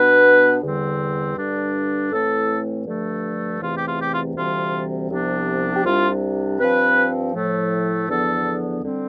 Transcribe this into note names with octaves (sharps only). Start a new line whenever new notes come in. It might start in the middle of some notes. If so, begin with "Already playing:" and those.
Already playing: B2 B3 D4 B4
E2 D3 G3 C4
G2 D3 G3 D4
A2 E3 A3 C4 A4
G2 D3 F3 A3
E2 C3 E3 A3 C4 F4
G4
F4
G4
F4
D2 C3 E3 G3 C4 F4
C2 C3 F3 B3 D4
G4
C2 C3 G3 D4 F4
G2 F3 C4 B4
A2 F3 A3
E2 D3 F3 B3 D4 A4
D3 G3 C4